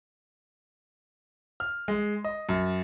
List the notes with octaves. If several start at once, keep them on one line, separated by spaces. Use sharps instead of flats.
F6
G#3
D#5
F#2